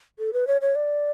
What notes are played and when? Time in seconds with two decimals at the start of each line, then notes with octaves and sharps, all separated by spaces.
0.19 A4
0.33 B4
0.47 C#5
0.61 C#5
0.75 D5